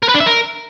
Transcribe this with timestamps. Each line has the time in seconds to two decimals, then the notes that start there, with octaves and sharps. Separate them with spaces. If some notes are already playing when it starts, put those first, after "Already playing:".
0.03 A#4
0.09 B4
0.14 D4
0.20 E5
0.26 A#4